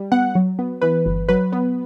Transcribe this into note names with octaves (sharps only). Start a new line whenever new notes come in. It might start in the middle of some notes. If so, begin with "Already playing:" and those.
Already playing: G3
B3 F#5
F#3
B3
E3 B4
G1
F#3 B4
B3